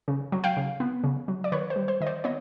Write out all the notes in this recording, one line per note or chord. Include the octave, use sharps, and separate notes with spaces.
C#3
F#3
F5 G5
C#3
B3
C#3
F#3
D5
D#3 B4 C#5
C5
G3
C5
D#3 D#5
C5 D5
B3 C#5 D#5